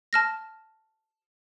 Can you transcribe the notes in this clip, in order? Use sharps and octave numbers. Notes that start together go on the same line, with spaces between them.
A5 F6 A#6